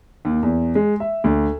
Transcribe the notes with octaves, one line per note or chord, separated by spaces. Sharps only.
D#2
E2
G#3
E5
D2